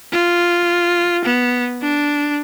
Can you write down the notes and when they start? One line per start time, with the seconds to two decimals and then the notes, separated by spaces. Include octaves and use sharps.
0.12 F4
1.25 B3
1.82 D4